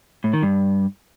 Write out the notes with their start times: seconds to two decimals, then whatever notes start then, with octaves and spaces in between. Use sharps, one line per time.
0.24 A2
0.33 D#3
0.43 G2